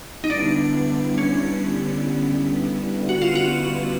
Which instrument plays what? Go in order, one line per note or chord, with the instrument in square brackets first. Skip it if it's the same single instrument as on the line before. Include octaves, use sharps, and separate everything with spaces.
[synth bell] D#4
[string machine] D3 G3 B3 E4 [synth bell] D4
[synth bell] C#4
F#4
F4
F#4